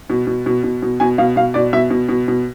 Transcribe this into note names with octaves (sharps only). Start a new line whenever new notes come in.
B2
B2
B2
B2
B2
B2 G#5
B2 F5
B2 F5
B2 D5
B2 E5
B2
B2
B2